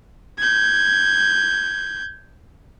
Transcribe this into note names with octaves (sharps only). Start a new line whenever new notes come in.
G6 G#6